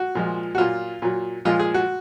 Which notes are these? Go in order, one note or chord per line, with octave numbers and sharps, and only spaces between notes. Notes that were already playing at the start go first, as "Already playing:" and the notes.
Already playing: F#4
A#2 F3 G#3
F#4
A#2 F#3 F4
A#2 F#3
A#2 F3 G#3 F4
G#4
F#4